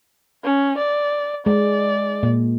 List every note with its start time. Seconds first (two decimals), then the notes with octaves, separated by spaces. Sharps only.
0.44 C#4
0.77 D5
1.46 G#3 D5
2.23 A#2